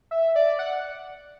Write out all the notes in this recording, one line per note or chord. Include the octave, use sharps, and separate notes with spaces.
E5
D5
F#5